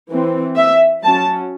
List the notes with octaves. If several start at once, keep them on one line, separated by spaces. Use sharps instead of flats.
E3 C4
E5
F#3 C#4 A5